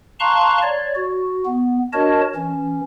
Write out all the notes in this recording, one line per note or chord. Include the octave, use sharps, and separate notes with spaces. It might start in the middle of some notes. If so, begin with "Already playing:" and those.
F5 A5 A#5 C6 C#6 F#6
C#5 D5
F#4
B3
D4 F#4 A#4 C#5 D#5 A5
E3 C#4